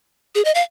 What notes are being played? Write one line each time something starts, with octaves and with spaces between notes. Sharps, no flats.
G#4
D#5
F5